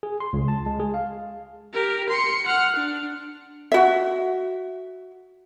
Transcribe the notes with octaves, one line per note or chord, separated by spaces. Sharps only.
G#4
C6
C#2
A5
G#3
G#4
F5
G4 A#4
C6 C#7
F#5 F6
D4
F#4 E5